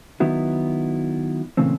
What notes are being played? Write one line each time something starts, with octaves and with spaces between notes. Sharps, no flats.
D#3 F#3 B3 E4 F#4
A#2 C#3 E3 A3 C4